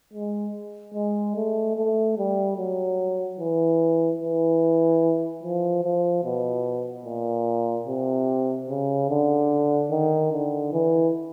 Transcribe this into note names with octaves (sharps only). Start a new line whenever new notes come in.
G#3
G#3
A3
A3
G3
F#3
E3
E3
F3
F3
B2
A#2
C3
C#3
D3
D#3
D3
E3